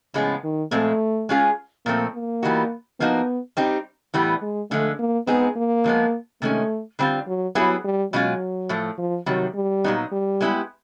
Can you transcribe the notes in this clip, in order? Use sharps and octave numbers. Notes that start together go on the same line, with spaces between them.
A2 C#3 F3 G#3 B3
D#3
A#2 F3 G#3 A3 C4
G#3 C#4 F4 G#4
A#2 F3 A3 A#3 C4
A#3
E3 G3 B3 D#4 F#4
F3 A#3 B3 D#4 F#4
G3 C4 D#4 G4
A2 E3 G3 B3
G#3
D3 F3 G#3 A3
A#3
G#3 B3 C4 D#4 G#4
A#3
D3 F3 G#3 B3
C3 D#3 G#3 A3 C#4
D3 G3 C4 F4
F#3
F#3 G3 B3 E4 G#4
G3
B2 F#3 G#3 C#4 F4
A2 F3 A3
F3
C3 D#3 F#3 G3
G3
A#2 F#3 B3 D#4
G3
G#3 B3 E4 G4